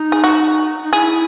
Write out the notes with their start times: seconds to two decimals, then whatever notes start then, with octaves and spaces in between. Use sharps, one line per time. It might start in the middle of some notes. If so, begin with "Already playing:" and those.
Already playing: D#4
0.12 G#4
0.24 F#4
0.83 D#4
0.93 E4 G#4